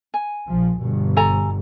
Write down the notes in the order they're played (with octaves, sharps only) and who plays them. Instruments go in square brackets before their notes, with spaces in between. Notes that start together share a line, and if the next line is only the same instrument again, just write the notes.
[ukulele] G#5
[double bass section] A#1 F3
G1 B2
[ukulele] A4 G#5 A#5